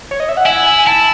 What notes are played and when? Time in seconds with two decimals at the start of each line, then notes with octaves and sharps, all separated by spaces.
0.11 C#5
0.20 D#5
0.29 E5
0.37 F#5
0.46 E4 G#5
0.67 G#5
0.78 G#5
0.86 E4 A5